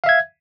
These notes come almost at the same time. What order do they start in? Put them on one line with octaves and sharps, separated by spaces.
F5 E5 G#6